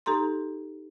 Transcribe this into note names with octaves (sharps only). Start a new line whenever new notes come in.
D#4 G4 A4 A#5 C6